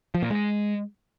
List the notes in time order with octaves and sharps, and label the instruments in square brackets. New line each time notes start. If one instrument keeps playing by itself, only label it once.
[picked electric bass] F3
A#2
G#3